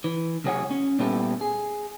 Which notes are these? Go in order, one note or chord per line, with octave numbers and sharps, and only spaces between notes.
E3
C#2 C3 F#3 G#4 C#5 F#5
C#4
A#2 G3 B3 E4 G4 A4
G#4